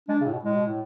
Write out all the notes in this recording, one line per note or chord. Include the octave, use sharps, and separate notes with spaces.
G#3 D4
C#3
A2
B2
A2 G#3
B2
A2